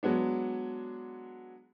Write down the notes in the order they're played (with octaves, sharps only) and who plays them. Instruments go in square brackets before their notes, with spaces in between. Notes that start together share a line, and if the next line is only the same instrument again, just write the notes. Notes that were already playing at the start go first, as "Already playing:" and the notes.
[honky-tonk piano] F#3 G#3 B3 D4